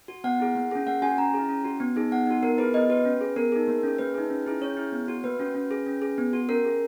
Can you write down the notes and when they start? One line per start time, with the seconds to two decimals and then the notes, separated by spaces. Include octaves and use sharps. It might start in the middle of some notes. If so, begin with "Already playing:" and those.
0.08 F#4
0.24 B3 F#5
0.40 E4 G#4
0.55 A#3
0.71 C#4 G#4
0.86 A#3 F#5
1.02 C#4 F#4 G#5
1.18 C#4 A#5
1.33 E4 G#4
1.49 C#4
1.64 F#4
1.80 B3
1.96 D#4 G#4
2.11 B3 F#5
2.27 D#4 F#4
2.43 B3 A#4
2.58 E4 G#4 B4
2.74 B3 D#5
2.90 F#4 B4
3.05 C#4
3.21 G#4
3.36 B3 A#4
3.52 D#4 G#4
3.68 A#3
3.83 C#4 G#4
3.98 A#3 B4
4.14 D#4 G#4
4.30 C#4
4.46 E4 G#4
4.61 C#4 C#5
4.77 E4 G#4
4.92 B3
5.08 F#4
5.23 A#3 B4
5.39 C#4 F#4
5.55 C#4
5.71 G#4
5.86 C#4
6.02 G#4
6.18 B3
6.33 F#4
6.49 C#4 A#4
6.65 G#4